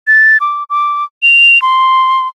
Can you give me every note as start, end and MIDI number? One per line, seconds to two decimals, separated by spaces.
0.07 0.37 93
0.41 0.64 86
0.70 1.04 86
1.23 1.61 101
1.62 2.28 84